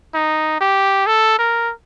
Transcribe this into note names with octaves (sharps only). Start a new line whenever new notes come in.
D#4
G4
A4
A#4